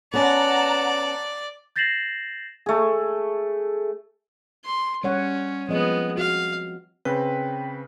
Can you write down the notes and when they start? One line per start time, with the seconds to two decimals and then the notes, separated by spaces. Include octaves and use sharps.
0.14 B3 C#4 D5 F#5 A5 A#5
1.76 G6 A6 A#6 C7 E7 F#7
2.66 A3 G#4
4.65 C6
5.04 G3 C#4 C#5 F#5
5.69 F3 G#3 B3 C4 D#5
6.17 F#4 F5
7.05 C#3 C4 B4 G5